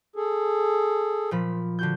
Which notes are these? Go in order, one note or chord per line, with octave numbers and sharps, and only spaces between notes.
G#4 A4
A#2 F3 B5
D3 F#4 G6